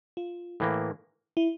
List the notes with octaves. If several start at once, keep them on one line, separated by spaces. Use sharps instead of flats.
F4
A2 E3 A#3
E4